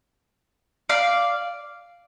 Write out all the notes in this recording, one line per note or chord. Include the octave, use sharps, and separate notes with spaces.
D5 F5